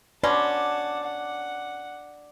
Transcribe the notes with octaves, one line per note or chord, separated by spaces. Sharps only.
B2 C#4 D5 F#5 A5 C6
F#5